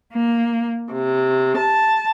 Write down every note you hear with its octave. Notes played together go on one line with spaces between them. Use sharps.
A#3
C3
A5